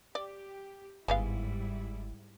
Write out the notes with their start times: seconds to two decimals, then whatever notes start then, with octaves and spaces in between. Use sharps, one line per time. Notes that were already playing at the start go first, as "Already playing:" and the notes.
0.15 G4 D5
1.08 G1 G#2 G3 G#3 B3 E4 F5